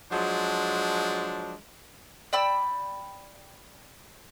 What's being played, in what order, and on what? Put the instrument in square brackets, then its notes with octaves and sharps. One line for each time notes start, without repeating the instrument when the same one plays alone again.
[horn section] F3 F#3 G#3 D4
[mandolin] D5 G5 B5 E6